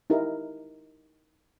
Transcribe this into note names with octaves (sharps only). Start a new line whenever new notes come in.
D#4 E4 G4 A#4